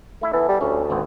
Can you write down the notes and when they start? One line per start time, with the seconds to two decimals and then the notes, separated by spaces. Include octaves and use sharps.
0.21 A3 E4 E5
0.33 E3 B3 A4
0.48 G3
0.61 D2 C#4
0.90 G#1 B3 C4